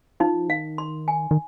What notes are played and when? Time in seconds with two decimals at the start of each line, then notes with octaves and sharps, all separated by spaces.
0.20 F3 D#4
0.49 D#3 F5
0.78 C6
1.08 G#5
1.31 D#3